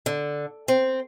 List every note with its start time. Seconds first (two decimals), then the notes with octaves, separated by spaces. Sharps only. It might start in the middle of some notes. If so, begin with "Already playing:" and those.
0.06 D3
0.68 C4